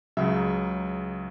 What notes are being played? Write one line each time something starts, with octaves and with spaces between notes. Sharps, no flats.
C#2 C#3 F#3 E5